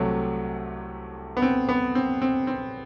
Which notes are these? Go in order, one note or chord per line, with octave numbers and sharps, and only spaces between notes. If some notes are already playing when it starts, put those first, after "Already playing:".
Already playing: C2 C3 F#3 A3
B3
C4
B3
C4
C4
C4